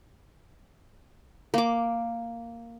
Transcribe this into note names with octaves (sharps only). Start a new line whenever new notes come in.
A#3 D6